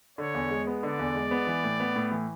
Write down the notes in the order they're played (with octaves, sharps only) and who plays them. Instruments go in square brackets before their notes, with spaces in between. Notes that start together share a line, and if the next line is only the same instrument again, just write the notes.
[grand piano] D3 [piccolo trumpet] C#5
[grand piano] E2
G#3
B3
[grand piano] D3 [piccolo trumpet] D5
[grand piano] E2
G#3
B3
E3
A2
B3
A2
E3